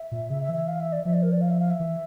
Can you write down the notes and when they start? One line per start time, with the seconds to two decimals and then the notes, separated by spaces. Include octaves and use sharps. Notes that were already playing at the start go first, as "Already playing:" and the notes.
Already playing: E5
0.12 A#2
0.30 C#3 E5
0.43 E5
0.49 E3
0.54 E5
0.68 F5
0.80 E5
0.92 D5
1.05 F3 E5
1.13 D5
1.23 A#4
1.32 D5
1.41 F5
1.51 E5
1.60 F5
1.70 E5
1.80 E3